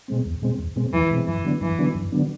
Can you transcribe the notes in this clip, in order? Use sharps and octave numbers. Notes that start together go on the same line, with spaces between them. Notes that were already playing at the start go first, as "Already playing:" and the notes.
B2 G#3 C4
E2
B2 G#3 C4
E2
B2 G#3 C4
E2 E3
B2 G#3 C4
F#2 E3
D3 F#3 B3 D4
F#2 E3
D3 F#3 B3 D4
F#2
D3 F#3 B3 D4